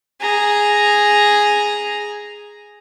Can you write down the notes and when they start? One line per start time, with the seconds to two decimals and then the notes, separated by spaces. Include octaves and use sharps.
0.21 G#4 A#5